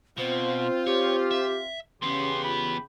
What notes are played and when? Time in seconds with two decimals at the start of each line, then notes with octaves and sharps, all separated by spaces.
0.17 B2 C4 F4 C5
0.87 G4 C#5
1.31 E5
2.02 E2 C#3 B3 C#4 G4 C6
2.44 F4 B5